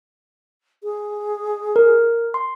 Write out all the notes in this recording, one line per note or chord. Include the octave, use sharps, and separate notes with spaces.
G#4
A#4
C6